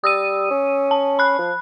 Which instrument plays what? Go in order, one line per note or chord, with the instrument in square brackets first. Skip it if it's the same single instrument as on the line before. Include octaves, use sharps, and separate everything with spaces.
[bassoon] G3 [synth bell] D#6 E6 D#7
[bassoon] C#4
[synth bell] A5
B5 F#6
[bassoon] F3